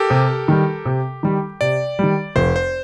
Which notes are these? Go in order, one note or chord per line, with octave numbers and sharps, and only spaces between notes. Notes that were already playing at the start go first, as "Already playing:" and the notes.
Already playing: G4 A4 A#4
C3
D#3 G3
C3
D#3 G3
C3 D5
D#3 G3
F1 C5
C5